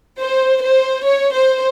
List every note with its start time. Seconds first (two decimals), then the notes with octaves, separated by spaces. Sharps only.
0.21 C5
0.63 C5
1.05 C#5
1.35 C5